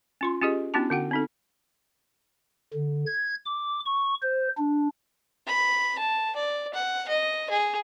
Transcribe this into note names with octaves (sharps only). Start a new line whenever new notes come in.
C#4 F4 C6
C#4 F4 G4 G#4 D#5
B3 C#4 D4 E4 F#4 A5
D3 F#4 F#5 G5
C4 D#4 A4
D3
G#6
D6
C#6
C5
D4
B5
A5
D5
F#5
D#5
G#4